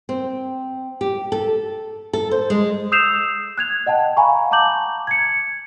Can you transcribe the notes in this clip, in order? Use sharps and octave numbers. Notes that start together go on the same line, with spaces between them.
C4
G4
A4
A4
C5
G#3
D#6 E6 G6 C7 E7 F7
F#6 G#6 F7
D#5 F#5 G5 A5
F5 G#5 A#5 B5 C#6
A5 A#5 D6 G6 F#7
G#6 C#7